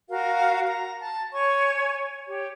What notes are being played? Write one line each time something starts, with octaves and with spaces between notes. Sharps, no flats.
F#4 A#4 F5
A#5
A5
C#5 G#5 C#6
G4 C#5